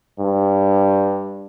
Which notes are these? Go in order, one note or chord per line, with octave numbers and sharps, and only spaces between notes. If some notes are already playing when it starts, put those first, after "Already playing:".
G2